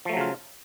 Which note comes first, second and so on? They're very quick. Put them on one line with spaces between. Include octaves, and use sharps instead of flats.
F3 A3 F#3 C#3 F4